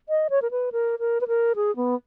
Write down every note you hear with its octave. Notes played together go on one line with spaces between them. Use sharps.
D#5
C#5
A#4
B4
A#4
A#4
B4
A#4
G#4
B3